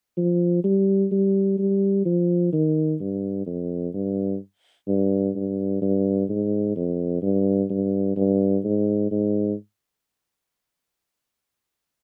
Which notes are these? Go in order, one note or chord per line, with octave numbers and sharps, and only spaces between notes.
F3
G3
G3
G3
F3
D#3
G2
F2
G2
G2
G2
G2
G#2
F2
G2
G2
G2
G#2
G#2